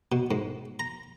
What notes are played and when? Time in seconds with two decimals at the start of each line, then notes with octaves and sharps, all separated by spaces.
0.12 B2
0.31 G#2
0.80 A#5